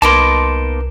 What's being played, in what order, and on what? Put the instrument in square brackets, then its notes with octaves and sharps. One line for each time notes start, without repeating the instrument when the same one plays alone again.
[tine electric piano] C2 [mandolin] A#3 B3 D#4 [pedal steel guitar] A5 C6 [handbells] D6 D7